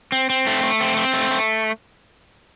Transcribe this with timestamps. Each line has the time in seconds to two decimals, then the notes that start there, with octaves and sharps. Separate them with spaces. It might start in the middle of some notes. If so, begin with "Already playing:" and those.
0.12 C4
0.30 C4
0.47 A3
0.63 A3
0.81 C4
0.97 C4
1.13 A3
1.31 A3